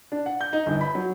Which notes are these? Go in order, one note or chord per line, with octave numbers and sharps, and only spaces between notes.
D4
F#5
G6
D#4
G1
B5
F#3